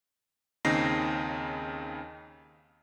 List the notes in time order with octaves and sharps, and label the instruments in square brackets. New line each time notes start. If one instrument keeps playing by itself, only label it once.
[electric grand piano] D#2 C#3 C4 D#4 A#6 C7